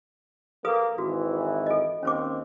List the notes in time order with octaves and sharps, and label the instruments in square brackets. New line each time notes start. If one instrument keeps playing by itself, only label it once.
[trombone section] A#3 [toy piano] A4 B4 D#6
[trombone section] G#1 E3 [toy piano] F#4
[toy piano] A4 D#5
[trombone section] D#2 C4 [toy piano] C#4 C5 D6